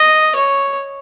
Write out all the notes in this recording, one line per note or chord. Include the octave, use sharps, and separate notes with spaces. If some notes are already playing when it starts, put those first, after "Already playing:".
Already playing: D#5
C#5